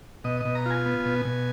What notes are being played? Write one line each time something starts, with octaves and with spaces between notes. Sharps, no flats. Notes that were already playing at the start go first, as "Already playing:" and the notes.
B2 D#5
B2 D#5
A#5
F4 G#5
B3
B2
B2